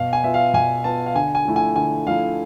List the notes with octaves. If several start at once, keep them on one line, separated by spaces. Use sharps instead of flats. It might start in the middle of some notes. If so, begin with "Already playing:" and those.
Already playing: B2 F5
G#5
B3 F4 E5
F5
B2 G#5
B3 F4 A5
F5
D3 G#5
G#5
F3 A3 E4
G#5
D3 G#5
F3 A3 E4 F5